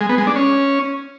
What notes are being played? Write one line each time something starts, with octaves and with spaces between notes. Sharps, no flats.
G#3
B3
G#3
D4
C#4